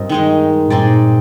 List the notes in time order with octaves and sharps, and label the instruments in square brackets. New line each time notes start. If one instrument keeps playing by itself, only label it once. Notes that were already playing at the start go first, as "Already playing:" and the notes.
Already playing: [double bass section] G2 [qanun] C4 F4 A#4 D#5
[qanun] D#3 G#3 D#4
[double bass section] G2 A#2 [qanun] C4 D#4 G#4 D5